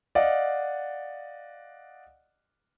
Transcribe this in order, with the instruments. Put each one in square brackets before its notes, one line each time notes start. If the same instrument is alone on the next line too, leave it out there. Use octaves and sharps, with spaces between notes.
[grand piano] D5 D#5 F5 F#5